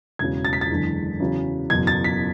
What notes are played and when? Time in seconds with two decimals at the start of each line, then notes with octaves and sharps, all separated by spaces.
0.19 E1 E2 C#3 F#3 G#6
0.45 A6
0.53 B6
0.61 A6
0.70 F#1 E2 D3 G#3
1.20 E2 C#3 F#3
1.70 F#1 E2 B2 G#6
1.87 A6
2.04 B6